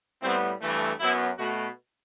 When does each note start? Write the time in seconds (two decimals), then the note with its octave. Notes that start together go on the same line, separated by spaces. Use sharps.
0.21 A2 G3 B3 C4
0.60 G2 E3 A3
0.99 F#2 F#3 B3 E4
1.37 B2 A3 F#4